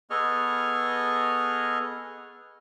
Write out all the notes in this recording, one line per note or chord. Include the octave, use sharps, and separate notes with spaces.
B3 G#4 A4 D#5 C#6 F6